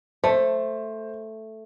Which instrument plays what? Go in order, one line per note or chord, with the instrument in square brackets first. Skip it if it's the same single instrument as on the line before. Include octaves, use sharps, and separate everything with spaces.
[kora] A3 [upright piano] C5